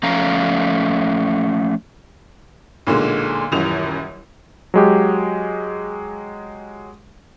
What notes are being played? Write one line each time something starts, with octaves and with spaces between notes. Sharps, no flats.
F3 A3 C#4 F5 A#5
B1 A#2 D3 G#3
D#1 A1 F#2 F7
F#3 G#3 G4